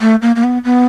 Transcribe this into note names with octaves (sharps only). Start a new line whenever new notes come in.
A3
A#3
A#3
B3
B3